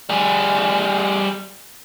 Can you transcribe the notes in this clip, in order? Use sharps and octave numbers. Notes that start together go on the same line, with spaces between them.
G3 G#4